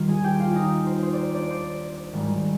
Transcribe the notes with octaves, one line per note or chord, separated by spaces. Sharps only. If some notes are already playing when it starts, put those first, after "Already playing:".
Already playing: D#2 D#3 G3 F4 F5
G#4 G#5
G4 G5
F4 F5
D#4 D#5
C5
C5
C5 D5
D4 D5
C5
G#1 G#2 D#3 G3